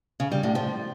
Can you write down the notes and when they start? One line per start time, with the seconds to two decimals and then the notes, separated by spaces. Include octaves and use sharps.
0.20 C#3
0.32 G3
0.43 A2
0.55 F3